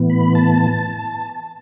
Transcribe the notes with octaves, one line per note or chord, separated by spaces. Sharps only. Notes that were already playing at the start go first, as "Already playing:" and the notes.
Already playing: A2 E3 B3
B5
A5